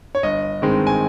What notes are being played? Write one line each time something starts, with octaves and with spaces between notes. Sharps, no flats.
C#5
G1 D#5
G2 D#3 G#3 C4
G#5